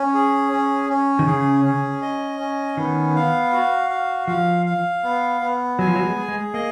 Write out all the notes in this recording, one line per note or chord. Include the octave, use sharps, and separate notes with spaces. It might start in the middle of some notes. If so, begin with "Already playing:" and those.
Already playing: C#4
G#4
C#4
C#4
D#3
C#3 G#4
C#4
D#5
C#4
D#3 B3
F5
F#4
F5
F3 F5
F5
B3
B3
F#3 G#5
F3
F#3
G#3
G#4
G#3
A#3 D#5